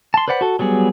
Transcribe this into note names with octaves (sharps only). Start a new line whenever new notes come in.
A5 C6
B4 C5 D5 F#5 B5
F#4 A4
F#3 G3 B3 G#4